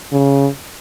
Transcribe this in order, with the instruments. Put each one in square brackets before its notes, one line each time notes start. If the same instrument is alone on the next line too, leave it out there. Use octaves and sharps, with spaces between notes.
[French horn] C#3